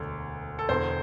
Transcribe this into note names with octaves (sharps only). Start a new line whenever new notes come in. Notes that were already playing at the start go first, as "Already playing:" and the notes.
Already playing: E1 D2 D3
A4
E1 E2 D3 C5